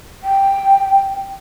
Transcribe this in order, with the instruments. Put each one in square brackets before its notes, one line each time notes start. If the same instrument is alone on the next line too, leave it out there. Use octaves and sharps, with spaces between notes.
[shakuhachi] G5